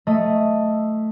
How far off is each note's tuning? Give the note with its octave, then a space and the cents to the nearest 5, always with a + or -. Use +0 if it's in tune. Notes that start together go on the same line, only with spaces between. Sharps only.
A3 +0 D#5 +0